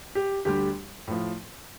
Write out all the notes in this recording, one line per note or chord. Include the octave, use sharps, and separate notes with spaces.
G4
D2 D3 G3 G4
A2 F3